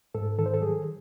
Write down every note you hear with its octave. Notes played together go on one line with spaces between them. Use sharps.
G#2 A4
D#3 A4
C5
A4
F#3 G#4